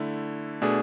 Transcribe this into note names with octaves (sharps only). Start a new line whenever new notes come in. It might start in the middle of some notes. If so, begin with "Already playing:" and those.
Already playing: D3 A3 E4
B2 A3 D4 G#4